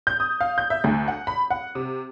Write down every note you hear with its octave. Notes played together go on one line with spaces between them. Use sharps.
G6
D#6
F5
G6
E5
D2
F#5
B5
F#5
C3